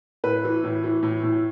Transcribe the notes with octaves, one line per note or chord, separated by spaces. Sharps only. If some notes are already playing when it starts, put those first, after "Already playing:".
A2 B4
E3
A2
E3
A2
A2